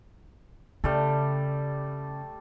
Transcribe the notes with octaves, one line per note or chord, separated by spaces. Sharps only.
C#3 G3 A3 A4